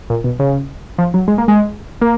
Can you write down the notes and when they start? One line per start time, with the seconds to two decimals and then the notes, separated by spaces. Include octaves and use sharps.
0.10 A#2
0.24 B2
0.39 C#3
0.98 F3
1.14 F#3
1.28 G#3
1.38 A#3
1.48 G#3
2.01 A#3